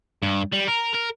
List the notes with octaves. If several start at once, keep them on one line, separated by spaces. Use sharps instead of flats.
G2
G3
A#4
A#4